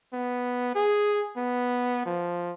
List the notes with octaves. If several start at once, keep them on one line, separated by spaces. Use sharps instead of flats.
B3
G#4
B3
F3